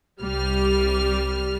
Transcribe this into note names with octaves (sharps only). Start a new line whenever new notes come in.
C2 G3 F6